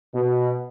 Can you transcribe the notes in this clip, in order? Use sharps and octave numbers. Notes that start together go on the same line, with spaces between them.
B2